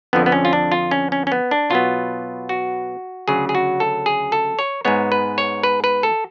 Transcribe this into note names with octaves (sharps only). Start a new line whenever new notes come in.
F2 D3 F3 B3
B3
C#4
F4
D4
F4
C#4
C#4
C#4
B3
D4
B2 F#3 B3 F4
F#4
D2 C#3 F#3 G#4
G#4
F#4
A4
G#4
A4
C#5
G#2 G#3 B3 C#5
B4
C#5
B4
B4
A4